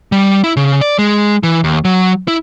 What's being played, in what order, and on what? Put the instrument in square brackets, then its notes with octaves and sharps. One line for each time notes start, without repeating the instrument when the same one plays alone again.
[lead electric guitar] G3
E4
C#3
D5
G#3
E3
D#2
F#3
E4